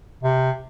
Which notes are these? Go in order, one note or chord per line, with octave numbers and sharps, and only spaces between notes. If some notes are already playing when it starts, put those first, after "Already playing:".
C3